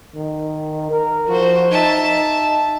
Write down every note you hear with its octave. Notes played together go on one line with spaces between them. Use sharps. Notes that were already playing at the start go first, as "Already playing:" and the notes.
D#3
A#4
F3 F#4 C5
D#4 E5 A5